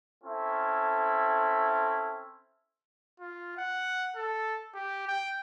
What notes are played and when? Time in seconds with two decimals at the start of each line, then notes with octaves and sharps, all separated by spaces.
0.24 C4 C#4 E4 A4
3.20 F4
3.57 F#5
4.16 A4
4.74 G4
5.07 G5